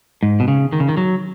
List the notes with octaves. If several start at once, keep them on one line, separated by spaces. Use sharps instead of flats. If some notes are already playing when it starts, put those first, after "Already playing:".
G#2
B2
C#3
D#3
C#3
D#3
F#3